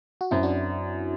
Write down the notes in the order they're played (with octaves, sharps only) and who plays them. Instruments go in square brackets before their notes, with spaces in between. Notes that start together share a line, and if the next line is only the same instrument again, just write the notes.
[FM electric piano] F#4
[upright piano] F#2 [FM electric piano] C4 E4
[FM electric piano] D4 F#4